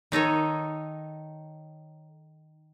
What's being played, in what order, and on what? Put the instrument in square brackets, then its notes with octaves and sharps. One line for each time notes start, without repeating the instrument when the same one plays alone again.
[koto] D#3 D#4 A4 C#5